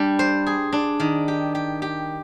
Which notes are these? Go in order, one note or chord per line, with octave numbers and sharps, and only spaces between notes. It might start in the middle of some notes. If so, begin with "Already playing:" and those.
Already playing: G3 D4
C5
G#4
D4
D#3
G4
G4
G4